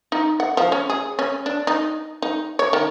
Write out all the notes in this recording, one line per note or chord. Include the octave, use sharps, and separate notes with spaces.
D#4
F#5
F3
C#4
G#4
C#4
D4
D#4
D#4
C#5
D#3